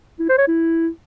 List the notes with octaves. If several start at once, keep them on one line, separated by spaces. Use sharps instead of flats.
E4
C5
C#5
E4